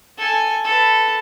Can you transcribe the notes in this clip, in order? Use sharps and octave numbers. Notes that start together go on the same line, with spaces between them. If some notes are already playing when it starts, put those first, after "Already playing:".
A4 G#5
A4 B4